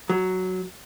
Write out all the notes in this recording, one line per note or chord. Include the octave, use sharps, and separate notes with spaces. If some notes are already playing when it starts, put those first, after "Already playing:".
F#3